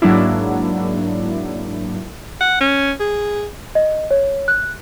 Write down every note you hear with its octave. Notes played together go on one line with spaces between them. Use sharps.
G#2 F#3 A#3 D4 E4
F#5
C#4
G#4
D#5
C#5
F#6